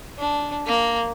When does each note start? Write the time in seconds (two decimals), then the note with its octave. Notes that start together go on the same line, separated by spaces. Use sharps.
0.18 D4
0.66 A#3